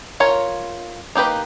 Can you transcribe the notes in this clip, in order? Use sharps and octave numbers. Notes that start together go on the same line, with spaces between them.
F4 A#4 C#5
A#3 D#4 G4 B4